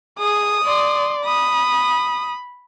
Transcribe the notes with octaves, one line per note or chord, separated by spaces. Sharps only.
G#4 D#6
D5 C6
B5 D#6